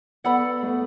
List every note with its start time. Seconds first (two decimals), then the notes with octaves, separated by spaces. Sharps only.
0.24 B3 A4 D5 F#5 B5
0.63 A3
0.67 B3